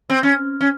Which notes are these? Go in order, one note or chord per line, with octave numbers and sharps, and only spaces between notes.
C4
C#4
C#4